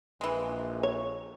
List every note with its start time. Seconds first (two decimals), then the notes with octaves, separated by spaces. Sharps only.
0.21 A#1 E3 G#3
0.83 C#5